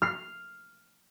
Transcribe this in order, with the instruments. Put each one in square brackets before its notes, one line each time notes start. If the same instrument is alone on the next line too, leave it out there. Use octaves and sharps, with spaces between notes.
[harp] F6 C7